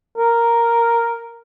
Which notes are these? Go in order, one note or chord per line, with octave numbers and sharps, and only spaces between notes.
A#4